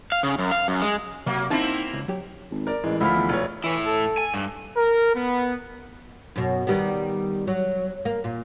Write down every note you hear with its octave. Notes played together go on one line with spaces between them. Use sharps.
F5
C#3
F#2
F5
F#2
G#3
C3 F#3 A#3
A#3 C4 D#4 E4 A5
C#2
F#3 G4
G#1
A#4 D5
A1 E3 G#3
D2 F3 A3 E4 F5 B5
E2
E1 C#5
A2 E3 E4
A4
G#5
G2
A#4
B3
F#2 B2
D#3 G3 B3
F#3
A#3
A#2